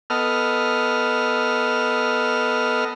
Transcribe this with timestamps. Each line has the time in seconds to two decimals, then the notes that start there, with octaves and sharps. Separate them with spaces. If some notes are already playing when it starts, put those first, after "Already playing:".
0.10 B3 A4 D#5 F6